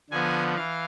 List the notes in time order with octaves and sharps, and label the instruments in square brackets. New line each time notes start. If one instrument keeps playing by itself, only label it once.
[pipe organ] D3 F3 B3 G#5
E3 F5